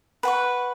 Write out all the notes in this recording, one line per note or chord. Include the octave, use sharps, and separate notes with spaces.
B4 F#5 C#6